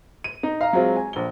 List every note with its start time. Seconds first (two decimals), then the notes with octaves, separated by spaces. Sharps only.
0.24 D#7
0.43 D#4
0.61 F5 A#5
0.73 F#3 G#3 C4 F4
0.96 G#5
1.13 A#1 G7